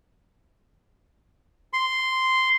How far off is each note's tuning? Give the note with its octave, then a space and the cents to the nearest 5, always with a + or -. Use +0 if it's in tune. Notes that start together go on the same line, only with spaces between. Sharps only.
C6 -5